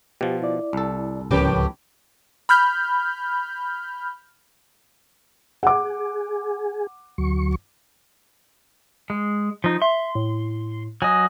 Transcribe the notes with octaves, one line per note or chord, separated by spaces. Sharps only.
B2 F3 G4
E4 D5
C2 A4
D1 C#2 A2 F3 C#4 G4 A#4 B4
B5 F6 G6
G#4 F#5 D6
D2 F#3 C#6
G#3
F3 D#4
E5 C6
A2
F#3 D#5 G#5